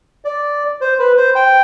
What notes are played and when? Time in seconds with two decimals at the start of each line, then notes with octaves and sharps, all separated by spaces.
0.25 D5
0.81 C5
1.00 B4
1.17 C5
1.35 G5